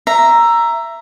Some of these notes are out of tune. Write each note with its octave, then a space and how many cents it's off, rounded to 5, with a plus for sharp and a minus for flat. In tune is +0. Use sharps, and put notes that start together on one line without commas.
E5 +15 A#5 +0